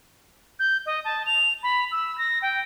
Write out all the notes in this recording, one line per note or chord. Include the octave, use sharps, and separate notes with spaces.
G6
D#5
A5
F7
B5
E6
A#6
G5